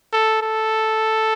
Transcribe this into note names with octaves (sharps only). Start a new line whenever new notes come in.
A4
A4